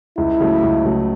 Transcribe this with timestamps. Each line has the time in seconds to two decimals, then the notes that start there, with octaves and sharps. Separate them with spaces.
0.18 C#2 E4
0.40 C#3 F#3 A3
0.63 C#2
0.85 C#3 F#3 A3